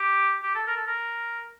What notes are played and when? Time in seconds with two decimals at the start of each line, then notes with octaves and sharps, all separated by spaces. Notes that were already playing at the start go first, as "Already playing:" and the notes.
Already playing: G4
0.43 G4
0.55 A4
0.67 A#4
0.77 A4
0.87 A#4